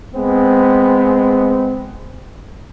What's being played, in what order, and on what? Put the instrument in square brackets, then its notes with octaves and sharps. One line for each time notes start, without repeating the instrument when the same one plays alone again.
[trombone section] G#3 B3 C4